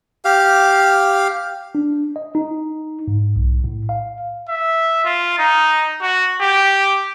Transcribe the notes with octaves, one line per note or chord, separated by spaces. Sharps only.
G4 F5
D4
D#5
D#4
G#2
B1
A2
F5
E5
F4
D#4
F#4
G4